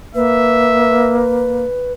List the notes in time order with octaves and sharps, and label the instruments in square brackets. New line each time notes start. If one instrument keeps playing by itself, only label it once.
[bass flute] A#3 [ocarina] B4 [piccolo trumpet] E5